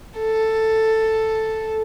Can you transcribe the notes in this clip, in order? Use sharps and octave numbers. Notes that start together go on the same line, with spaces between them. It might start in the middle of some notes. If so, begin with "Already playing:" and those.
A4